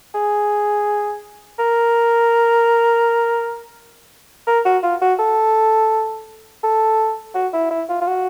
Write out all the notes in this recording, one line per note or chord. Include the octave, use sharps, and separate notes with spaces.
G#4
A#4
A#4
F#4
F4
F#4
A4
A4
F#4
E4
E4
F4
F4
F#4